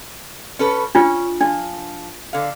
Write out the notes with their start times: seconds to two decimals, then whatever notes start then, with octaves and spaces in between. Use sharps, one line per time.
0.59 C#4 A4 B4
0.95 C#4 D4 F4
1.41 F3 D4
2.33 D3 F5